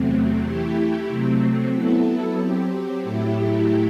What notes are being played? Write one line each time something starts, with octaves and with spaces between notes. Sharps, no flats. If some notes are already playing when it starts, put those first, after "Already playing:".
Already playing: E2 C3 F#3 A3 C4
E3 A3 E4 G4
C3 F#3 A3 C4
F#3 B3 E4 A4
F#3 C4 G4
A2 F#3 A3 E4 G4